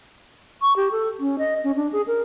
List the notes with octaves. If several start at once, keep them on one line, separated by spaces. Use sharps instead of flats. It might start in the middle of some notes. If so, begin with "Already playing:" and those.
C#6
G4
A4
C#4
D#5
C#4
D4
G#4
A#4